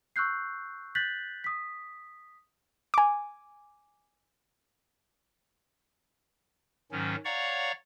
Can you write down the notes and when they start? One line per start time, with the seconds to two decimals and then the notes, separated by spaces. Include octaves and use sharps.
0.16 C#6 E6 F#6 G6 C7
0.95 F#6 G6 A6 B6 F#7
1.44 D#6 B6
2.94 G#5 D6
6.92 G#2 D#3 F#3 C#4
7.25 C#5 D5 F5 F#5 A#5 C#6